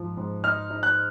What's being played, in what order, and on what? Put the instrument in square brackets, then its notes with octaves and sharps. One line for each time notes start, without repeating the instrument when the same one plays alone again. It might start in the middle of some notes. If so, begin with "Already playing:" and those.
Already playing: [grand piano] G#2 F3
G#2
[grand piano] D#4 [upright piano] F6
[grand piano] D#4
[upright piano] F#6